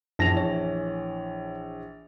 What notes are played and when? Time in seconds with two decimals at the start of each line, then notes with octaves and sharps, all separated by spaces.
0.19 A#1 F#2 E3 A5 A#6 F7
0.37 C#5